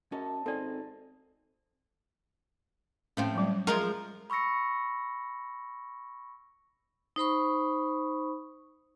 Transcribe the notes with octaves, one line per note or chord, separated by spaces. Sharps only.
F#2 C#4 D#5 A5
G#1 C4 A4 D5 G#5
A2 F3 C4 C#4 F5
F#3 G3
F3 G#3 F4 A#4
B5 C#6 E6 A#6 C#7
D#4 C5 B5 C#6